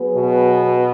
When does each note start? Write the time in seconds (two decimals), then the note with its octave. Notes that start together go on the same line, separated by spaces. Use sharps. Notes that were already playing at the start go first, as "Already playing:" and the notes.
Already playing: F#3 B3 G#4 B4
0.17 B2